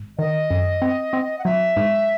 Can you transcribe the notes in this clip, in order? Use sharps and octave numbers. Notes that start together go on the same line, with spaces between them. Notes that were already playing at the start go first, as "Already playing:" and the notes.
Already playing: G#1
D#3 D#5
F#2
C4
C4
F#5
F#3 E5
G#2